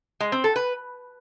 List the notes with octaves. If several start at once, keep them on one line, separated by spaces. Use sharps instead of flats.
G#3
C4
A4
B4